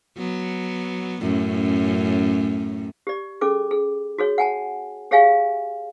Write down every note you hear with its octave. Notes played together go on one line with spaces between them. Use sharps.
F#3 B3
F#2 A2 C#4
G4 D5
C#4 G#4 A4 D6
G#4
F#4 G#4 C#5
F#5 G#5 A5
G4 G#4 C#5 E5 F5 G#5